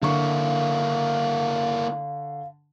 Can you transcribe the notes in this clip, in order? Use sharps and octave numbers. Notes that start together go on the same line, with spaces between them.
D3 A#3 E4 F5 C#6